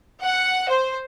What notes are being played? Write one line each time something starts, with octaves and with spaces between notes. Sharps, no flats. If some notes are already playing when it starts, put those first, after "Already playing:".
F#5
C5